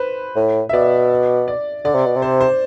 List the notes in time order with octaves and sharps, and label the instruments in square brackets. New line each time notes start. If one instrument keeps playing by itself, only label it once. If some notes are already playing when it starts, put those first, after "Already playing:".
Already playing: [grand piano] B4 C5
[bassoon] A2
[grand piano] E5
[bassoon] B2 [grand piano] D5
[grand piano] D5
[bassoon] D3 [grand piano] D5
[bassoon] C3
B2
C3
[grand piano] C5
C5